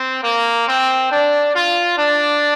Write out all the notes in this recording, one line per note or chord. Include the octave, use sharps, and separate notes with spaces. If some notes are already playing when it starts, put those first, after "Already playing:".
Already playing: C4
A#3
C4
D4
F4
D4